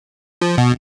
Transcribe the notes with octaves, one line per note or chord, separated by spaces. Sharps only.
F3
B2